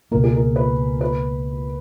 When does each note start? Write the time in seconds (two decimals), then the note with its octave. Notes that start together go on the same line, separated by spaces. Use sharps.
0.11 C#2 B2 A#3 A#4
0.24 G#4
0.36 A#4
0.56 B4
1.01 B4